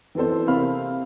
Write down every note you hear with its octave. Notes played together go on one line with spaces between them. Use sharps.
E3 B3 C4 A4 C5
C3 A#3 C4 F5 B5 F6